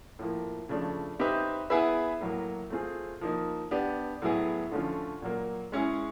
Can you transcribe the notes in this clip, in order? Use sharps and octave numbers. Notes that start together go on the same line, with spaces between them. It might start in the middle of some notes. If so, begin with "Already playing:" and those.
A2 F3 A#3
C#3 F3 A3 D4
C4 D#4 G4 B4 E5
B3 E4 G#4 B4 E5
A2 F#3 A#3
A3 C4 F4 G#4
F3 A#3 D#4
B3 D4 G4
A2 F#3 B3 E4 G#4
D3 F3 A3 C#4 F4
A#2 F#3 A#3
G#3 C#4 E4 G#4